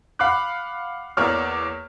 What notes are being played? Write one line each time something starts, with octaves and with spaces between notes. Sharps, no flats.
F5 F#5 B5 D6 F#6
E2 A#3 C#5 D5 D6 F6